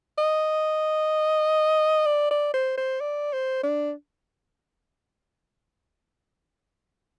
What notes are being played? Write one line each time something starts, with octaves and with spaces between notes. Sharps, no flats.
D#5
D5
D5
C5
C5
D5
C5
D4